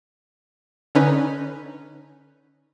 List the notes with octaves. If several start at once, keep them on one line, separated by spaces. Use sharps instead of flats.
D3 C#4 D#4 B4